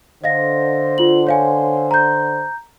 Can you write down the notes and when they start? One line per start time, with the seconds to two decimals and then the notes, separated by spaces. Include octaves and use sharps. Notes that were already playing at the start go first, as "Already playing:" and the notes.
0.24 D3 C5 D#5 F5 A#6
0.98 F4 F#7
1.27 C#5 F5 G#5
1.91 A#5 G6